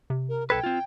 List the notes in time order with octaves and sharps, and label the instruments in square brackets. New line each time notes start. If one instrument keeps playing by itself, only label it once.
[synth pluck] C3
[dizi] A#4
[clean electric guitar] B1 A4 B4 [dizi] G5 [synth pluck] G#6
[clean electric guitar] C4 F4